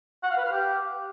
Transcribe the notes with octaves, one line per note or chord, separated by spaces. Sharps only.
F#5
F5
B4
F5
G4